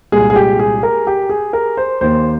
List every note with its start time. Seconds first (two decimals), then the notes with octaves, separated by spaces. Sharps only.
0.12 C2 A#2 G#3 G#4
0.30 G#4
0.36 G4
0.59 G#4
0.83 A#4
1.07 G4
1.30 G#4
1.53 A#4
1.77 C5
2.01 D#2 D#3 A#3 C5